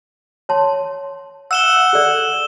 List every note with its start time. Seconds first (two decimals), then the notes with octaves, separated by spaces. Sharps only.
0.49 C#5 A5 C6
1.51 F#5 E6 E7 G7
1.93 G#4 A4 D5